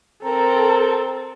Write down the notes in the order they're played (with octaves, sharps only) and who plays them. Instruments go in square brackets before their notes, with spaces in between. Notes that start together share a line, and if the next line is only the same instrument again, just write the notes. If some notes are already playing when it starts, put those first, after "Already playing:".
[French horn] C4 [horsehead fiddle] A4 [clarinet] A#4 [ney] A#5